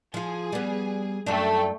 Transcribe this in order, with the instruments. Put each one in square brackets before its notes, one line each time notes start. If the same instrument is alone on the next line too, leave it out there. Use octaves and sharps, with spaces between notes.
[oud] F3 F4 [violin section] G#4
[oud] G3 B3
[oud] F#2 D4 [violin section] A3 G5